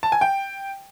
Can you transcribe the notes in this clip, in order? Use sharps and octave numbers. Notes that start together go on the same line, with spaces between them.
A5
G#5
G5